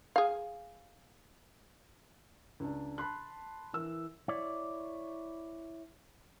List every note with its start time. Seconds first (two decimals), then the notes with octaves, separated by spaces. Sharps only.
0.16 G#4 F5
2.60 C#2 D4
2.98 A5 B5 C6 F#6
3.73 E3 A#4 E6
4.28 E4 C#5 D5